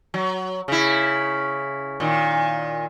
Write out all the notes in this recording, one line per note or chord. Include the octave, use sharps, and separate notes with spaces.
F#3
C#3 E4
A#2 D#3